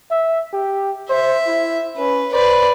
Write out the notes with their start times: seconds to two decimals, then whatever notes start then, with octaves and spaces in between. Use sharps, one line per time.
0.11 E5
0.53 G4
1.09 C5 E5
1.47 E4
1.97 C#4 B4
2.33 B4 C5 D5